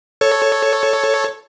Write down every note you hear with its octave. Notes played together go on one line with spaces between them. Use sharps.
A4 C#5